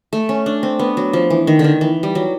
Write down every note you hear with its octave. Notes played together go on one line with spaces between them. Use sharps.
A3
C#4
D4
C4
B3
F#3
F3
E3
D#3
D3
D#3
E3
G3
F#3